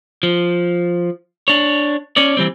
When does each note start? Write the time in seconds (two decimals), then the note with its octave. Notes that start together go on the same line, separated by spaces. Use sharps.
0.23 F3
1.48 D4 C#5
2.17 C#4 C#5 D5
2.37 E3 G3 C4